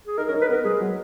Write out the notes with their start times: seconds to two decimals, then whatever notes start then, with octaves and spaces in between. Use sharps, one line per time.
0.07 G#4
0.18 D#4 A#4
0.29 C#4 A#4
0.33 D#4
0.41 B4
0.49 B3 A#4
0.64 G#3 G#4
0.80 F#3